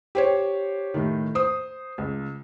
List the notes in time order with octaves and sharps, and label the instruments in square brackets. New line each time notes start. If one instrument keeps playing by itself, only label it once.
[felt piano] G4 C5 C#5
A2 D#3
C5 D#6
C#2